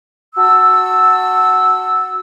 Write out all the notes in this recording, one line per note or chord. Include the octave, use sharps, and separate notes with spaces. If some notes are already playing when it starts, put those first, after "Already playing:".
F#4 A5 E6